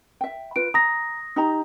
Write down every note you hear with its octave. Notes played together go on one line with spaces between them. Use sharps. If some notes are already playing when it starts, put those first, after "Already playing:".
E5 G5
F4 B4 D7
A#5 D#6 A#6
D#4 G4 A#5